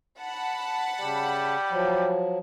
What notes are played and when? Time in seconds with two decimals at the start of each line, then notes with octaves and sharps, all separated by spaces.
0.19 F#5 A5 B5
1.01 C#3 G3
1.71 F3 F#3